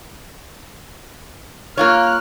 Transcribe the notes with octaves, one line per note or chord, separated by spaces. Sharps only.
A#3 F4 C#5 F6 F#6